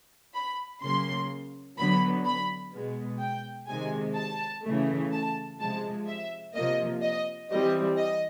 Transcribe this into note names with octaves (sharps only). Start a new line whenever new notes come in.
B5
C#3 F#3 A#3 C6
D3 F#3 B3 B5
B5
B2 G#3 B3
G5
C3 D#3 G#3 G#5
A5
C#3 E3 A3
A5
C3 F3 G#3 A5
E5
C3 F3 A#3 D#5
D#5
E3 G3 C4 D#5
D#5